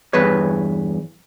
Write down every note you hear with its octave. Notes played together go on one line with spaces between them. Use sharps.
E2 G2 B4 C#5